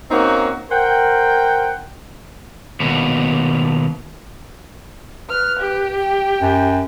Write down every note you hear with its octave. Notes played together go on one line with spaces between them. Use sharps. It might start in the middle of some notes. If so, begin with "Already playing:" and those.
A#3 C4 C#4 D#4 F#4
A#4 C5 F#5 G5
D#2 B2
B4 F6
G4
G5
F#2